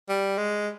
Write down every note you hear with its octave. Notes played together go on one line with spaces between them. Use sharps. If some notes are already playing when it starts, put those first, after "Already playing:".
G3
G#3